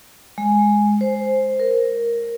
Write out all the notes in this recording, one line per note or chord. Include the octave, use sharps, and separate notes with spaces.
G#3
C5
A#4